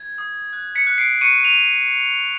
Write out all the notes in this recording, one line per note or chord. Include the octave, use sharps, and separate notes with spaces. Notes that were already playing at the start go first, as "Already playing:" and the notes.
Already playing: G#6
D#6
F#6
B6 C#7
F#6
C7 D7
C#6 C#7 D#7
D#7 F7